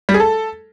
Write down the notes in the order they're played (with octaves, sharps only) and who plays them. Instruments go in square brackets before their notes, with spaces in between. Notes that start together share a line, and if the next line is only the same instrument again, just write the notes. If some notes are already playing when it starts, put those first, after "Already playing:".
[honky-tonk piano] G3
G#4
A4